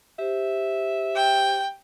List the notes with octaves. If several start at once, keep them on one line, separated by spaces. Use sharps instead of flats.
G4 C5 E5
G5